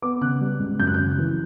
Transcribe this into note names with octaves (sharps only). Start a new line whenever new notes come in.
B3 D6
C#3 F#6
G3
C#2
F#2 G6
F#6
C#3 G6
E3